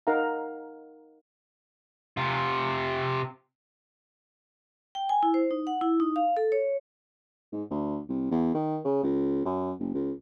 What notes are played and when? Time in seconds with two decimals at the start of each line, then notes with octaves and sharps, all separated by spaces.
0.07 D#4 A#4 F5 F#5 A#5
2.17 C3 F4
4.95 G5
5.09 G#5
5.23 E4
5.34 C5
5.51 D#4
5.67 F#5
5.81 E4
6.00 D#4
6.16 F5
6.37 A4
6.52 C#5
7.52 G#2
7.71 D2
8.09 C2
8.31 E2
8.54 D#3
8.85 C#3
9.03 C#2
9.45 F#2
9.80 F#1
9.94 C#2